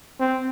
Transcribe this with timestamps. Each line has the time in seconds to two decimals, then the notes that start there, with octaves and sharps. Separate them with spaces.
0.20 C4